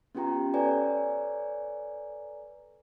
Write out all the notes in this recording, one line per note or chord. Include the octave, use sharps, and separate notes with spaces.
B3 C#4 F4 G4 G5 A#5
A4 B4 C#5 D5 G#5 A#5